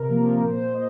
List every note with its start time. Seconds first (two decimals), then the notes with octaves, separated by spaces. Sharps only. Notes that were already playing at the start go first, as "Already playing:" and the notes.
Already playing: C3 A#4
0.09 F3 A#3
0.41 A#2 C5
0.74 A#3 D#5